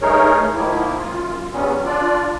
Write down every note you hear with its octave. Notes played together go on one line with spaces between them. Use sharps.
G2 A3 D#4 G#4 A#4 C#5
A3
G#2 D#3 F3 A#3 E4
F#2 F4
E2 G2 F#3 G3 B3 C#4
D4 F4 D5